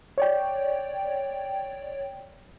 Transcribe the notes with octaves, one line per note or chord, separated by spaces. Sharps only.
C#5 D5 G5